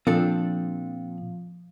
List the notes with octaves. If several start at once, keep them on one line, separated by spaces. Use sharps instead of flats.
A#2 F3 C4 D4 A4